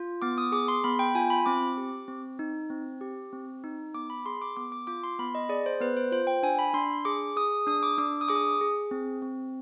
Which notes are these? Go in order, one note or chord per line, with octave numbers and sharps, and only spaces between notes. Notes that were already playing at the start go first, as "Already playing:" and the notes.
Already playing: F4
B3 D6
D#6
G#4 D6
C6
B3 B5
G5
F4 G#5
B5
C4 D6
G4
C4
D#4
C4
G4
C4
D#4
B3 D6
B5
G#4 C6
D6
B3 D6
D6
F4 D6
C6
B3 B5
D#5
G#4 D5
C5
B3 B4
C5
F4 C5
G5
D4 G#5
B5
D4 C6
G#4 D6
G#4 D#6
D4 D#6
D6
D4 D6
D#6
G#4 D6
D#6
G#4
C4
C4